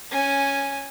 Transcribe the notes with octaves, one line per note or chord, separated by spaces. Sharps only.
C#4 G#5